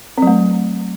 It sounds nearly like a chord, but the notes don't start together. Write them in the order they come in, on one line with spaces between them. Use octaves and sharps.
C4 F#3 A3